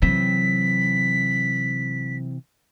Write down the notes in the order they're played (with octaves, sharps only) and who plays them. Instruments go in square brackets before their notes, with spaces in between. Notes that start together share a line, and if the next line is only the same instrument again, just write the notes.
[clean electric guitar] C3 E3 C4 [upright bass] F#3 [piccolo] B6